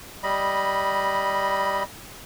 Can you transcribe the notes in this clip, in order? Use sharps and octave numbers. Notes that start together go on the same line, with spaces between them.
G3 D#5 B5